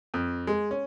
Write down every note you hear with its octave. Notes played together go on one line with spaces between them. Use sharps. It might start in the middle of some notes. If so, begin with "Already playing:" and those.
F2
G#3
C#4